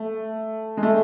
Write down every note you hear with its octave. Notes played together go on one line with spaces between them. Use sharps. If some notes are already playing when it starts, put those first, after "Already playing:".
Already playing: A3
G#3
A3